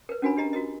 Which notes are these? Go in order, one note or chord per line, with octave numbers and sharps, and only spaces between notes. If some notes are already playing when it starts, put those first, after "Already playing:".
A#4 B4
C#4 D4 F#4 A#4 G#5 B5
D4 G4 D#5 A#5
F4 F#4 A#4 D#5